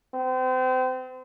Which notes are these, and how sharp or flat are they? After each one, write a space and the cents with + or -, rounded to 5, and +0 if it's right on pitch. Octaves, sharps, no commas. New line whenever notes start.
C4 -35